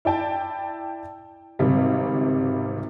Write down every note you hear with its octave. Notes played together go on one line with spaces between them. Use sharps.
E4 D5 G5 A5
G#1 C#2 C3 G3